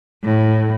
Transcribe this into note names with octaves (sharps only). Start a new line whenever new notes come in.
A2